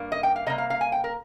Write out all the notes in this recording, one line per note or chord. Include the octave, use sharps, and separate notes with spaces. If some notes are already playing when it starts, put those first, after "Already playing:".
Already playing: G2 G3 A#3
D#5
G5
F5
C3 G3 A#3 D#5
F5
F5
G#5
G5
A#4